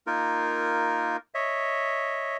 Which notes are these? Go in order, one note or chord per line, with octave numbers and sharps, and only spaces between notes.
A#3 D#4 F4 A#4
C#5 D#5 E5